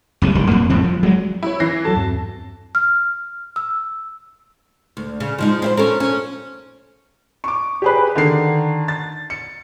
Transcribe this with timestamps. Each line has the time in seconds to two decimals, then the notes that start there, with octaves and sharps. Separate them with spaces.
0.22 F#1 C2 C3
0.35 E1 A#1 D#3 G3
0.48 F2 A#3
0.69 F2 A2 C4
0.84 F3
1.03 F#3 G#3
1.43 E4 C#5
1.60 E3 A#6 C7
1.85 F#3 F#4 A4 A5
1.96 E2 G2 C4
2.75 F6
3.56 E6
4.97 D2
5.20 C#3
5.39 F3 G#3 D#4
5.62 C4 E4 C5
5.77 C#4 A4 A#4
6.00 C#4
7.44 C#6 D6
7.82 G4 G#4 B4
8.16 D3 D#3 C7
8.88 A6
9.30 C#7